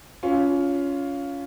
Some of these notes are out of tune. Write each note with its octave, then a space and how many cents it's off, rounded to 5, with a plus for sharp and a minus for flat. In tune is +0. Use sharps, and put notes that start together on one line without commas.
C#4 +20 F4 +0